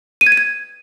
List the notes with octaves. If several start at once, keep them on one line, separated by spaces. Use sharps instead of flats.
D#7
G#6
D#7
G#6